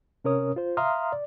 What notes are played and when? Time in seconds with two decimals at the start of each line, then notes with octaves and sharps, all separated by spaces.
0.24 C3 C#4 A#4 C#5 D#6
0.56 F4 C5
0.77 E5 F5 A#5 C6 D#6 F6
1.12 D5